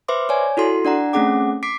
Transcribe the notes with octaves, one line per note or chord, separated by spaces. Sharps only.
B4 C5 E5 C6 D6
C#5 D5 G#5
E4 F#4 A4 C6
D4 D5 F#5 A#5
A3 C4 C#4 G#4 F#5 D6
D6 B6 C7 D7